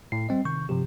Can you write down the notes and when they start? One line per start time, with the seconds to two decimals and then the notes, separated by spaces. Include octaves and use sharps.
0.12 A2 C7
0.29 G3 C4 D#5
0.45 C3 D#3 C#6 G6
0.69 G2 C3 F3 G4